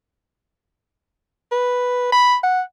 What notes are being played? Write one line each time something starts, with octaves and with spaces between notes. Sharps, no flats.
B4
B5
F#5